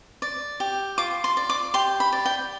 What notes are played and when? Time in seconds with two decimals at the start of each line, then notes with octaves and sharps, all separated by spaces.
0.22 D5
0.60 G4
0.98 F4 D6
1.24 C6
1.37 D5
1.50 D6
1.74 G4 C6
2.00 B5
2.12 D5
2.26 G5